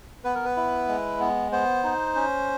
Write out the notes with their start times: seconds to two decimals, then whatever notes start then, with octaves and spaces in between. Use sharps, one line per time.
0.24 B3 B4
0.35 A#4
0.45 B4
0.57 E4
0.88 G#3
1.20 B3
1.52 B3 C5
1.83 D#4
2.15 C#4